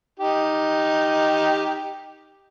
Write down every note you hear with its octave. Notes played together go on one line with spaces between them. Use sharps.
D#4 G4